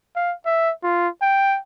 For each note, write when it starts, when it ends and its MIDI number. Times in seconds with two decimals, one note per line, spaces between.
0.16 0.34 77
0.45 0.72 76
0.83 1.08 65
1.21 1.58 79